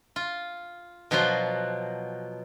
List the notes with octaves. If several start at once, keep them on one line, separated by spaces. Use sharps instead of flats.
F4
B2 F3 F#3 F#4 C6